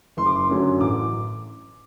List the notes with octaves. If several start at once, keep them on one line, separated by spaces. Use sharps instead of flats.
F#1 C6
D6
C6
F#2 D3 F#3
A1 D6